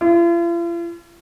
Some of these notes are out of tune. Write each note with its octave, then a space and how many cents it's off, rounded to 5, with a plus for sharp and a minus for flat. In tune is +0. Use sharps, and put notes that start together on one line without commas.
F4 -45